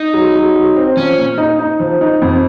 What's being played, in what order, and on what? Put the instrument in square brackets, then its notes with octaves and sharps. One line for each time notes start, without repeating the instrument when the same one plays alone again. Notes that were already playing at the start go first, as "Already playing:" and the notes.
Already playing: [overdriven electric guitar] D#4
[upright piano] F#3
F#3
F#3
C4
[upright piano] F3 [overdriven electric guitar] C#4
[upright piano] A#2
D#4
D#4
F3
D#4
F2